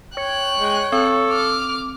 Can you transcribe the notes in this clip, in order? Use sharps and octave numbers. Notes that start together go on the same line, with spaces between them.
C#5 G5 F#6
G#3
C4 A4
D6 F6